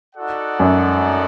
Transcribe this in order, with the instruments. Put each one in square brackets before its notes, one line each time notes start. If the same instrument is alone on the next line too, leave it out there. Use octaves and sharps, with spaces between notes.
[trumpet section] D#4 F#4 A4 D5 F#5
[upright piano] F#2